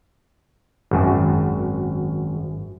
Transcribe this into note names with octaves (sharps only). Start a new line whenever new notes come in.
G#1 F#2